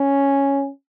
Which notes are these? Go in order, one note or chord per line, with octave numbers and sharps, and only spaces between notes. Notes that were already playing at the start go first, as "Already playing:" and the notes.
Already playing: C#4